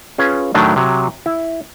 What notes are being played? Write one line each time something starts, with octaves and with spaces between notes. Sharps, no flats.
C#4 F4 G#4 B4
A2 D#3 F#3 A3 D4
C3 F#3
E4